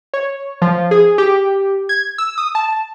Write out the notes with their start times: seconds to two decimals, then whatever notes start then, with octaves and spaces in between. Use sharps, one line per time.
0.14 C#5
0.62 F3
0.91 G#4
1.18 G4
1.89 G#6
2.18 E6
2.38 D#6
2.55 A5